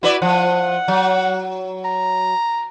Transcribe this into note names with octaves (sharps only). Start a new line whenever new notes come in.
E4 F#4 B4 D5
F3 F#5
F#3
A#5